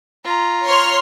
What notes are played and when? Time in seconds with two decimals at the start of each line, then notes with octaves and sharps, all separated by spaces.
0.25 F4 A#5
0.65 C#5 C6 F6